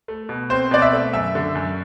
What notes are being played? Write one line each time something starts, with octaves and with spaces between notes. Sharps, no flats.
A3
B2
C4 C5
B2 D5
E5
A3
F#2 E5
D3
F#2